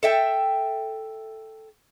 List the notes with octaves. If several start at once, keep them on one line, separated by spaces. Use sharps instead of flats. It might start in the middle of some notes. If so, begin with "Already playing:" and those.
A4 E5 G5